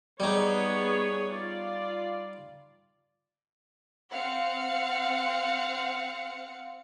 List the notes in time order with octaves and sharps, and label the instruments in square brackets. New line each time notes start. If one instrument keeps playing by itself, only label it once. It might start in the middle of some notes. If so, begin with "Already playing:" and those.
[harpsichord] G3 D#4 [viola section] B3 G#4 C#5
[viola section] F4 D5
[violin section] C4 F5 F#5 C#7